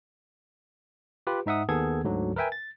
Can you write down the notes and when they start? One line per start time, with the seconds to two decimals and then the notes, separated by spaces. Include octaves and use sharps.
1.27 F4 G4 B4
1.46 G#2 D#4 E5 F#5 D#6
1.69 D#2 D#3 B3 G#4 A4 G#6
2.04 D2 G#2 D3 F#3
2.36 A#4 B4 E5 G5 G#5
2.52 A6